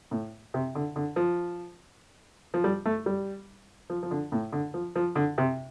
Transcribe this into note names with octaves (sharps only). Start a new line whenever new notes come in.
A2
C3
D3
D3
F3
F3
G3
A3
G3
F3
F3
D3
A2
D3
F3
F3
D3
C3